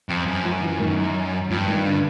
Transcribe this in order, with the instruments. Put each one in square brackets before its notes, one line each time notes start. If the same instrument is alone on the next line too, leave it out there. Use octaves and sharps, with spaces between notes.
[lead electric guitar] F2
F#2
[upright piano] F3
E3
D#3
[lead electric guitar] G2 [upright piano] F3
[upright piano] D#3
D3